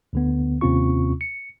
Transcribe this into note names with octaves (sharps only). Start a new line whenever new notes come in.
D2 D3 B3
D#2 C3 C4 C#4 F4 C#6
C#7